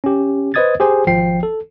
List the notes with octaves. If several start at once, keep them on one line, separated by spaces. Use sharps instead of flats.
C#4 G4
B4 C5 D#5 D#6 G#6 A6
G4 G#4 C5 G#5
G#1 F3 G5 C7
A4